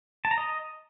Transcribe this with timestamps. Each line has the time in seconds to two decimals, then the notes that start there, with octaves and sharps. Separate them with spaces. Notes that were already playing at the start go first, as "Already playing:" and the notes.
0.25 A5
0.31 A#5
0.38 D#5